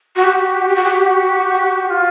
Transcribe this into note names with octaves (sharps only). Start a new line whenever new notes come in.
F#4
G4
F#4
G4
F#4
G4
F#4
G4
F#4
G4
F#4
G4
F#4
G4
F#4
G4
F#4
G4
F#4
G4
F#4
G4
F#4
F4